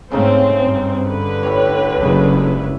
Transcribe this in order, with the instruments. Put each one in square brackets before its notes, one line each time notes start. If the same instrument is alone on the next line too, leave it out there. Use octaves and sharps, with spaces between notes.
[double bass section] G#2 A3 [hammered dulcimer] C#3 D#4 F5 [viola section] C4
[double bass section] G2
[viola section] D3 B4
[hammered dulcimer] A2 G3 C#5
[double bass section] F#1 C#3 G#3
[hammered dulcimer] E5